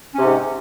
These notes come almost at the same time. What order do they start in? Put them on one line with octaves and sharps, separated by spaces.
C#4 C3 G#2